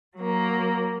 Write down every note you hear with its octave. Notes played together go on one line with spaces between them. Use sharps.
F#3 A#3